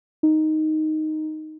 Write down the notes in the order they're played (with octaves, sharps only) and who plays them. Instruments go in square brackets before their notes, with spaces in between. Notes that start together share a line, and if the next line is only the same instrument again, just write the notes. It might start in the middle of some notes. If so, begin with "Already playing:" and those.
[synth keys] D#4